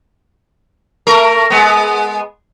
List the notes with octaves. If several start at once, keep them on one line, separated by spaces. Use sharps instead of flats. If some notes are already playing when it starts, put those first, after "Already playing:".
A3 A#4
G#3 B3